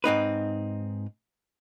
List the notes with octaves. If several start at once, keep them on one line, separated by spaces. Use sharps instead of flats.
G#2 C4 D#4 B4